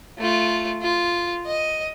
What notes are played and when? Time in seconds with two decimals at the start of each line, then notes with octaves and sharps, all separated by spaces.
0.18 A3 F4
0.82 F4
1.46 D#5